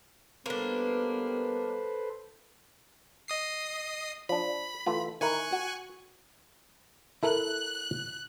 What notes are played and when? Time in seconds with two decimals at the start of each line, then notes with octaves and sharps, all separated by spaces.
0.46 G3 A#3 B3 D4 A4 B4 C5
3.28 D#5 D#6 C7
4.29 F3 D4 B5
4.86 E3 A3 F4
5.21 D#3 E4 A#4 G#5 C#6 F#6
5.53 F#4
7.23 E4 A4 A#4 F#6